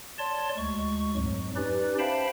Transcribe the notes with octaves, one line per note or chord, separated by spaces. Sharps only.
C#5 D5 A5 C6
D2 G#3 C#6
F2 G#2 F#3
C#4 D#4 G4 B4 D5
C5 E5 F5 G5 A5 B5